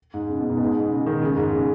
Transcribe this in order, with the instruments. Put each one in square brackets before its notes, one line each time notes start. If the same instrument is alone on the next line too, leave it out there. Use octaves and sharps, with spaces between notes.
[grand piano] G#2
C#3
B2
G#2
B2
G#2
C#3
D#3
C#3
G#2
C#3